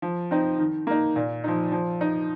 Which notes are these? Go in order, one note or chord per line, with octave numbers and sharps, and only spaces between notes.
F3
C4 D#4
D#3
A#3 D#4
A#2
F3 D#4
F3
D#4